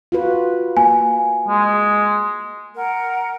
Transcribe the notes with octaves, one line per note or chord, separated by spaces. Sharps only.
F4 F#4 B4
A#3 G#5
G#3
A#4 F#5